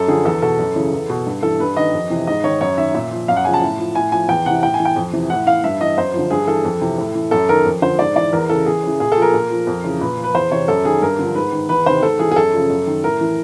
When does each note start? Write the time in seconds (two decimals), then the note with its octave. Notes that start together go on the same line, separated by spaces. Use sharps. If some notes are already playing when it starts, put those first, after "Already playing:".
Already playing: F#2 A4
0.08 D3 F3 G#4
0.25 E2 A4
0.42 B2 A4
0.59 F#2
0.76 C#3 E3
0.93 E2
1.10 B2
1.26 G2
1.43 E3 A4
1.60 G2 B4
1.77 D#3 D#5
1.93 F2
2.10 C3 E3
2.27 G#2 D#5
2.44 D#3 C#5
2.61 F#2 C#5
2.78 D#3 E5
2.94 A#2 E5
3.11 F3
3.28 F#2 F5
3.37 F#5
3.45 C#3 F3 G#5
3.54 A5
3.62 A2
3.79 F3
3.95 A2 G#5
4.12 F3 G#5
4.29 E2 G5
4.46 C3 E3 F#5
4.63 A2 G5
4.74 G#5
4.80 E3
4.85 G5
4.96 F2
5.13 C3 E3
5.30 A2 F#5
5.47 E3 F5
5.64 G2 E5
5.81 E3 D#5
5.97 F#2 C5
6.14 D3 F3
6.31 G2 G#4
6.47 E3 A4
6.65 F2
6.81 C3 E3
6.98 A2
7.15 E3
7.31 F#2 A4
7.49 D#3 A#4
7.65 F2
7.82 D3 F3 C5
7.99 G#2 D5
8.16 E3 D5
8.33 E2 A#4
8.49 C#3 E3 A4
8.66 E2 G#4
8.83 C#3 E3
9.00 A#2 G#4
9.12 A4
9.17 F3 A#4
9.34 A#2
9.51 F3
9.67 F2
9.84 C#3 E3
10.01 A#2 B4
10.18 F3
10.24 B4
10.35 E2 C5
10.51 C3 E3 C#5
10.68 F#2 A4
10.85 D#3 G#4
11.02 G2 A#4
11.19 D3 F3
11.35 G#2 B4
11.52 D#3
11.69 E2 B4
11.86 C3 D#3 C5
12.03 G#2 A4
12.19 E3 G#4
12.31 G#4
12.36 F#2 A4
12.53 C#3 F3
12.70 F#2
12.87 D#3
13.03 A2 A#4
13.21 E3